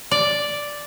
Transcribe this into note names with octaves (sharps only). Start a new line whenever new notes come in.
D5